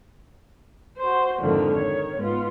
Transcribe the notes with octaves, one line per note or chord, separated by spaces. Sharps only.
F#4 C5
F2 G#2 D3 D#3 F3
D#3 C#5
G#2 B3 F4